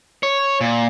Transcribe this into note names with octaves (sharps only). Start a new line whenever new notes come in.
C#5
A#2